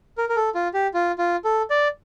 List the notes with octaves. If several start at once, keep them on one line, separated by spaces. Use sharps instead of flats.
A#4
A#4
A4
F4
G4
F4
F4
A4
D5